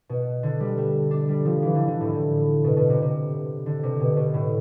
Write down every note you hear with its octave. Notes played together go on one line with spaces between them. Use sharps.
B2
D3
G3
A3
D4
G3
F3
E3
D3
D3
A2
A2
B2
B2
C3
C3
D3
C3
B2
B2
A2